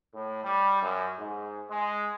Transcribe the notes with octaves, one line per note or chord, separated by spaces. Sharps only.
A2
G3
F#2
G#2
G#3